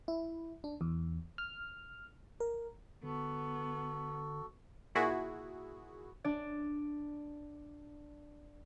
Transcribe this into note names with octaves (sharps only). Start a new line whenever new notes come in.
E4
D4
E2
F6
A#4
D3 B3 F#4 A4
A#2 E4 F#4 G#4
D4 D5